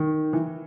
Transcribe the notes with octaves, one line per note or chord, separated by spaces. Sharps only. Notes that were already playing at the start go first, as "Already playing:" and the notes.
Already playing: D#3
E3